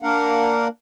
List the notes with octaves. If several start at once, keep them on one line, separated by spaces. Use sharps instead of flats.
A#3 D4 A#4 F5 F#5